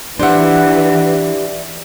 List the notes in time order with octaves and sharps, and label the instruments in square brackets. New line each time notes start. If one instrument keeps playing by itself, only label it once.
[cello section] E3 [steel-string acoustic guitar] D4 E5 [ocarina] G4 [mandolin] C5 F#5